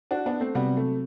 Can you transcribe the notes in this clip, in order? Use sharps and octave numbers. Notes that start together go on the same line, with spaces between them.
D4 F#4
B3 D4
A3 C4
C3 F#3 G3 B3 C4 F#4
A3